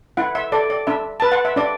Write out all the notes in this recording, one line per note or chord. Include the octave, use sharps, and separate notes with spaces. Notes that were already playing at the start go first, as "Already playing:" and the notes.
E4 F#5
E5
A4 D5
D5
D4 E5
B4 A5
F#5
E5
D4 D5